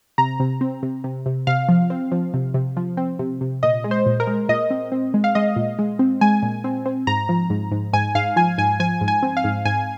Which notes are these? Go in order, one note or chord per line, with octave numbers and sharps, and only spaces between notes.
C3 A#5
C3
C4
C3
C3
C3
C3 F5
F3
C4
F3
C3
C3
F3
C4
C3
C3
A#2 D#5
G#3
C5
A#2
A#4
G#3
A#2 D#5
C4
C4
G#3
F5
G#3 D#5
A#2
G#3
C4
G#3 G#5
A#2
C4
C4
G#2 A#5
F3
G#2
G#2
G#2 G#5
G#2 F5
F3 G#5
G#2 G#5
F3 G#5
G#2
G#5
C4
F5
G#2
G#2 G#5